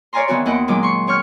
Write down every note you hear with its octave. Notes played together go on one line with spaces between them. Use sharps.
C#5 D5 F5 G#5 A#5 C6
D#3 E3 B3 C4 F#4 C#5
D#2 B3 E4 D#5 F#5 G5
A#2 D#3 F#3 G#3 D#4 D6
C6 C#6
C4 C#5 C#6 F6 G6